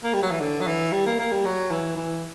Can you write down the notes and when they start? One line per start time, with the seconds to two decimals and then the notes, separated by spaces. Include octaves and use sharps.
0.04 A#3
0.14 G3
0.23 F#3
0.31 E3
0.40 D3
0.61 F#3
0.67 E3
0.92 G3
1.06 A#3
1.19 A#3
1.32 G3
1.45 F#3
1.71 E3
1.97 E3